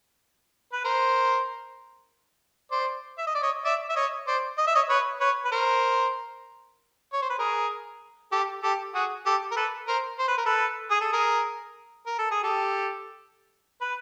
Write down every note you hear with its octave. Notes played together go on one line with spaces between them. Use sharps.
B4
A#4 C5
C5 D5
E5
D#5
D5
C#5 D#5
D5 E5
E5
C#5 D#5
C5 D5
D#5
E5
C#5 D#5
B4 C#5
B4 C#5
B4
A#4 C5
C#5
C5
B4
G#4 A#4
G4 A4
G4 A4
F#4 G#4
G4 A4
A#4
A4 B4
A#4 C5
C5
B4
A#4
A4 B4
G#4
A4
G#4 A#4
A#4
A4
G#4
G4 A4
B4